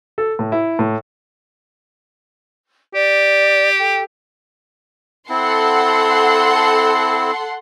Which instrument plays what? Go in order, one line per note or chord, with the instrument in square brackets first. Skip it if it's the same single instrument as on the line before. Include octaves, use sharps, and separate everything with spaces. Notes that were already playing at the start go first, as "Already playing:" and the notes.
[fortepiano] A4
A2
E4
A2
[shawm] G4 [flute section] D5
[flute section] A4 G5
[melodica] C4 E4 [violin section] A4 F#5 C6